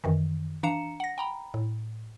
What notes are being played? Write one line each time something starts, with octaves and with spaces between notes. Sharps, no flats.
F#2 D#3 E3
E3 D4 F5 A#5 C#7 E7
F#5 A#6
G5 A#5 B5
A2